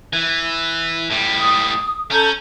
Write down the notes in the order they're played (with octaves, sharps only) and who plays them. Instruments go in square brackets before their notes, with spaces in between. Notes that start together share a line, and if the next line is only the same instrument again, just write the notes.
[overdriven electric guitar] E3
A2 G3
[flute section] D#6
[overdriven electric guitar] C#4 [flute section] A4 A#5 G6